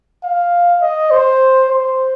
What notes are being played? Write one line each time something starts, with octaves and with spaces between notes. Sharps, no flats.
F5
D#5
C5
C5